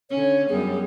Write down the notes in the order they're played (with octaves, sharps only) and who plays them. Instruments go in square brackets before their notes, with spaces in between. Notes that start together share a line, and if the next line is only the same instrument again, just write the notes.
[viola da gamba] D3 C#4 [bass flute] C#5
[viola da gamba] F#2 G3 B3 [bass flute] G#4